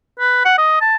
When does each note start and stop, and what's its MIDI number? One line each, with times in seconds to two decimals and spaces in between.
0.20 0.43 71
0.45 0.54 78
0.58 0.78 75
0.81 0.96 81